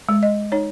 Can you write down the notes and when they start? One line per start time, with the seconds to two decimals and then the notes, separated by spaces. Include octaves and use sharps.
0.09 G#3
0.23 D#5
0.52 D#4 C#5